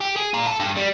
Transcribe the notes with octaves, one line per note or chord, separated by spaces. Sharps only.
G4
G#4
F4 A#4
A4
G2
G3